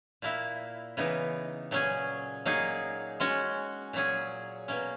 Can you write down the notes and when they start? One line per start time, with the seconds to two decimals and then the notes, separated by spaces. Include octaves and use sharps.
0.22 A#2 A#3 E4
0.97 C#3 E3 B3 D#4
1.71 A#2 F#3 C#4 G#4
2.45 F#3 A#3 D#4 G#4
3.20 G#3 C#4 F#4
3.93 A#2 F#3 C#4 G#4
4.68 B2 A#3 C#4